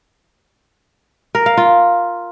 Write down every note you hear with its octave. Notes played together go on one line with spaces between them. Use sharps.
A#4
F5
F4